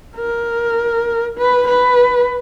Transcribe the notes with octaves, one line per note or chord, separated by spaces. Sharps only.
A#4
B4
B4